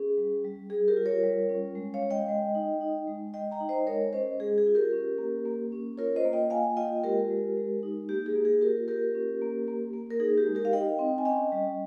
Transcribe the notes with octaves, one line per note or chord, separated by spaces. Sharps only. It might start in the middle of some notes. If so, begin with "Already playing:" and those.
Already playing: C#4 G#4
G3
G3
G3 G#4
G4 A#4
F4
A#4 C#5
G3
C#4
G#3
C#5 F5
G#3
D#5 G5
G#3
D#4
D#4
G#3
G#3 D#5 G5
G5 A#5
D#4
C5 D#5
G#3 A#4 C#5
C#4 C5 D#5
G#3 G#4
G#4
F4
G4 A#4
C#4
A#3
A#3
C#4
F4 A#4 C#5
C5 D#5
A#3
D#5 G5
A#3 F5 G#5
F4 D#5 G5
G#3 G4 A#4
G#3
G#3
D#4
A#3 G4
G#4
A#3
G#4
F4 G4 A#4
A#3 G4 A#4
C#4
A#3
A#3
A#3
A#4
D#4 G#4
G4
G#3
G4 A#4
F5
D#4 D#5 G5
C4
G#5
C#4 D#5 G5
G3